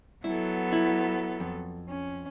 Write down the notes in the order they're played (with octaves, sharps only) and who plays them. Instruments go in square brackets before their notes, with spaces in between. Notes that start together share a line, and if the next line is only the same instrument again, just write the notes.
[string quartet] F#3 B3 A4 [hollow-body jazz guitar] E4
[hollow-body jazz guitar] E4
F2
[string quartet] C#4